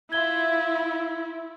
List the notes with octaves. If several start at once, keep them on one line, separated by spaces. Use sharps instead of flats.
E4 F4 E5 G#6 G7